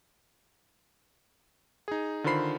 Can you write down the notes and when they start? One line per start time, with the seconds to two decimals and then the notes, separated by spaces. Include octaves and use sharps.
1.88 D#4 G#4
2.24 D3 D#3 F4 C5 B5 C7